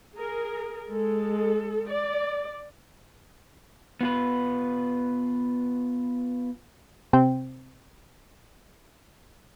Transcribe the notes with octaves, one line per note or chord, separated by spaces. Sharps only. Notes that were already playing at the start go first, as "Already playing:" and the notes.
G#4 A#4
G#3 A4
D5
B3 F4 B4
C3 C4 G5